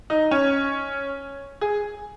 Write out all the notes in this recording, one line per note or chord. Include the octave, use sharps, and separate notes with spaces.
D#4
C#4
G#4